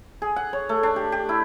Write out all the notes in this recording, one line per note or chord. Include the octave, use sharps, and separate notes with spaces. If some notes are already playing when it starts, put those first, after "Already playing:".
G#4
F#5
C#5
A3
D4
G4
G4
E4